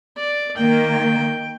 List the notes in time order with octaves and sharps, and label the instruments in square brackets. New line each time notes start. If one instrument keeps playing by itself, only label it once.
[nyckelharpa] D5
[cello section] D#3 A#3 [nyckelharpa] G5